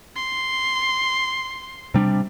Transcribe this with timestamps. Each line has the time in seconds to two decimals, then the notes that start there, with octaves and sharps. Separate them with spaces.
0.16 C6
1.94 C3 G3 D4